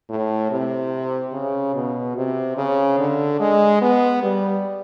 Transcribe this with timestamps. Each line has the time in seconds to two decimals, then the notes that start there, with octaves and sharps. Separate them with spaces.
0.09 A2
0.51 C3
1.33 C#3
1.75 B2
2.16 C3
2.57 C#3
2.99 D3
3.40 G#3
3.82 B3
4.23 G3